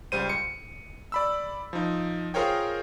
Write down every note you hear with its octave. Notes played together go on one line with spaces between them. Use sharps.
C#2 G3 C5 D#7
C#7
D5 B5 E6
F3 D#4
F4 G#4 A#4 C5 C#5 G5